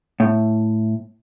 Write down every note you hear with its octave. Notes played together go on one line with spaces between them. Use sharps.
A2